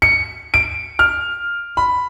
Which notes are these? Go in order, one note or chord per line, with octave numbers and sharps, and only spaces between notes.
C#7
D7
F6
B5